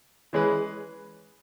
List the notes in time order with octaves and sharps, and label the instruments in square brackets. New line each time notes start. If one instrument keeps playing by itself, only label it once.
[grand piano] E3 G#3 C#4 G#4 B4